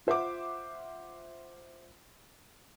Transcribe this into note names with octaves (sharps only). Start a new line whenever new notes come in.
F4 C5 E5 F#5 D6